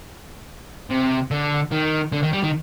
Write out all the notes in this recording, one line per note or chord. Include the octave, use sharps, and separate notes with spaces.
C3
D3
D#3
D3
D#3
G3
D#3